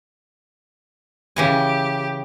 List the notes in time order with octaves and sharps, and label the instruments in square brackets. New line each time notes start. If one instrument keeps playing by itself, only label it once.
[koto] C#3 E3 G#5 [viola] G4